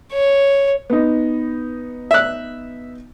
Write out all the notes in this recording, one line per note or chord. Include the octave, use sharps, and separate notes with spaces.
C#5
B3 D#4
E5 F#6